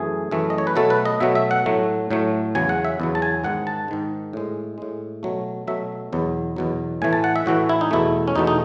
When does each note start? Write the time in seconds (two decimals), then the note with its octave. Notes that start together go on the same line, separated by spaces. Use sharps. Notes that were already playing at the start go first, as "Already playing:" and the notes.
Already playing: F#2 E3 A3 G#4
0.31 F#2 E3 A3
0.50 D#5
0.58 C#5
0.67 B4
0.76 B2 F#3 A3 A4
0.90 B4
1.05 D#5
1.20 B2 F#3 A3 E5
1.35 E5
1.51 F#5
1.66 A2 F#3 A3
2.11 A2 F#3 A3
2.55 E2 C#3 F#3 G#5
2.69 F#5
2.85 E5
3.00 E2 C#3 F#3
3.15 A5
3.22 G#5
3.44 G#2 D#3 G#3 F#5
3.67 A5
3.88 G#2 D#3 G#3
4.33 A2 G#3
4.78 A2 G#3
5.23 B2 F#3 A3
5.67 B2 F#3 A3 E5
6.13 E2 B2 F#3
6.56 E2 B2 F#3
7.02 A2 E3 A3 G#5
7.13 A5
7.24 F#5
7.36 E5
7.46 A2 E3 A3 F#4
7.69 E4
7.81 D#4
7.91 E2 B2 A3 E4
8.28 C#4
8.36 E2 B2 A3 D#4
8.47 D#4